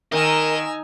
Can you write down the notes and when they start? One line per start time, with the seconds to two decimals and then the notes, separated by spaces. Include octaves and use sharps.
0.12 D#3 A#4 D#5 G#5 A#5 E6